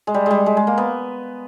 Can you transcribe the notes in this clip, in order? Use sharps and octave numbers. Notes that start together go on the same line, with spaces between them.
G#3
G3
G3 G#3
G#3
G#3
A#3
B3